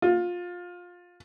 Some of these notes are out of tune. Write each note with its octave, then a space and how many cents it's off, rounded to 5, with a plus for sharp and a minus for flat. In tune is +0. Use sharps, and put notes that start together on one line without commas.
F4 +20